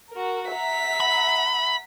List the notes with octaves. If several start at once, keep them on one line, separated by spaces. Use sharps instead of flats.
F#4 A#4
E5 F#5 A#5 B6
B5